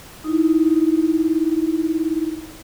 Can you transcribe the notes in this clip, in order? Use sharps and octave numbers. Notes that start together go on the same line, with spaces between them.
D#4 E4